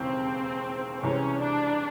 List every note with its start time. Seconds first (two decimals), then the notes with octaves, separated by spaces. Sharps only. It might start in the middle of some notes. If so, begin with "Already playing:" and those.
Already playing: E1 D#2 C#3 E3 C4
1.03 C2 C3 E3 G#3 C#4
1.42 D4